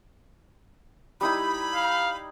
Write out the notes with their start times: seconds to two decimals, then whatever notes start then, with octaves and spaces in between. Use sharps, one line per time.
1.21 G3 D#4 E4 B5
1.74 F5